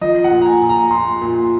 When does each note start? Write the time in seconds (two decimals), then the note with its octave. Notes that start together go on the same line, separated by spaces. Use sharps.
0.01 F3 D#5
0.24 F#5
0.31 A#2
0.42 A#5
0.46 G#5
0.62 A#2
0.69 A#5
0.91 A#2 C6
1.22 A#2